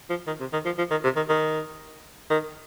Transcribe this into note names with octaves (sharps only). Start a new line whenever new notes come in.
F3
D#3
C3
D#3
F3
F3
D#3
C3
D#3
D#3
D#3